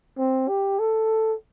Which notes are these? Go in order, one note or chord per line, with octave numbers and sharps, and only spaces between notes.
C4
G4
A4